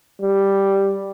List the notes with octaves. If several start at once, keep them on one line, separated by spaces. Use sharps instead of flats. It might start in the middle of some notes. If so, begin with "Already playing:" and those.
G3